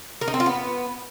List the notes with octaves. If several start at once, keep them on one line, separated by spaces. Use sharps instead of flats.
A#4
D#4
C4
F4
B3